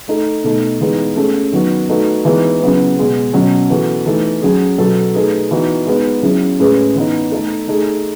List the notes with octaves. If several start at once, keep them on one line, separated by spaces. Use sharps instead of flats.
A3 D#4 A4
B2 A3 D#4
E3 G#3 B3 D#4
A3 C#4 G#4
D#3 F#3 B3 F#4
A3 D#4 F#4 B4
E3 G#3 B3 D#4
C#3 F#3 B3 E4 B4
B2 G#3 B3
B2 F#3 C#4
E3 B3 F#4 A4
E3 A3 D#4 A4
F#3 C#4 G#4
B2 F#3 B3 F#4 A4
A3 D#4 G#4 B4
E3 B3 D#4 F#4
G#3 B3 D#4
F#3 C#4 E4 G#4
A2 G#3 C#4 G#4 B4
E3 B3 D#4
A3 D#4 A4
A3 D#4 G#4